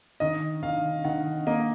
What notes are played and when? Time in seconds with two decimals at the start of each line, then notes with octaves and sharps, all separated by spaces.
0.20 D#3 D#5
0.63 D#3 F5
1.04 D#3 F#5
1.47 A#3 D#5